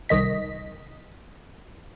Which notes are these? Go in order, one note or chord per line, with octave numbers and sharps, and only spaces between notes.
C2 D#3 D#5 B6